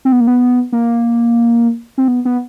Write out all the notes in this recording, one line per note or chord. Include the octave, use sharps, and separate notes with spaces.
C4
B3
A#3
B3
A#3
C4
B3
B3